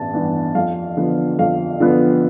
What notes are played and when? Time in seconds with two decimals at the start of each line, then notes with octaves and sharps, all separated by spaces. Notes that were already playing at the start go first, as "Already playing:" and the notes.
Already playing: A1 G2 E3 B3 A5
0.14 G2 E3 B3
0.55 F2 F5
0.97 D3 F3 B3
1.39 F2 F5
1.80 D3 F3 B3